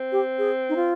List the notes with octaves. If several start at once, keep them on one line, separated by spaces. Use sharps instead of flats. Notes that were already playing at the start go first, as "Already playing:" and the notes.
Already playing: C4
G4
G#4
D#4
F4